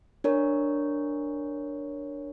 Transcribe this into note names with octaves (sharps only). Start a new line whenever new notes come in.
D4 A#4 C#5